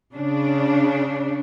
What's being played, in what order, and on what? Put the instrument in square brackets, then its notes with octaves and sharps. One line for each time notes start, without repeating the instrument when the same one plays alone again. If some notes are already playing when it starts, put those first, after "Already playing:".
[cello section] C#3 D4